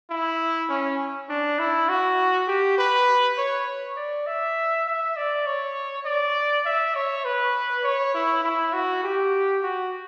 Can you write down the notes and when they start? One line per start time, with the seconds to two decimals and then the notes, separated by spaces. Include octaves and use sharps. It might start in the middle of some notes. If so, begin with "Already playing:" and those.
0.10 E4
0.69 C#4
1.29 D4
1.59 E4
1.89 F#4
2.47 G4
2.78 B4
3.37 C#5
3.97 D5
4.27 E5
4.87 E5
5.17 D5
5.46 C#5
6.05 D5
6.66 E5
6.95 C#5
7.25 B4
7.84 C#5
8.14 E4
8.44 E4
8.73 F#4
9.04 G4
9.63 F#4